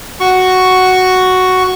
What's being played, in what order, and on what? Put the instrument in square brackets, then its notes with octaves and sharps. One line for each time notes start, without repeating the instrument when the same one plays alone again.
[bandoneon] F#4 C#6